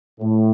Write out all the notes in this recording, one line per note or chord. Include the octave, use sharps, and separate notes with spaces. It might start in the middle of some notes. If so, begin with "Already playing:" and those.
A2